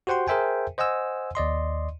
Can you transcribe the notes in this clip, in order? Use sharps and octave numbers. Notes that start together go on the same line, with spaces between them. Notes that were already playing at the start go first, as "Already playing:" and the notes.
F#4 G4 C5 F#5 G5 C6
G#4 A#4 C5 E5 G5 G#5
C5 D#5 F#5 G#5 E6
D#2 D5 D#5 C6